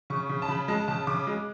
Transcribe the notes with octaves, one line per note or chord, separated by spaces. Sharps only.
C#3 C#6
C#3
A5
C#3 B5
G#3 A5
C#3 A5
C#3 D6
G#3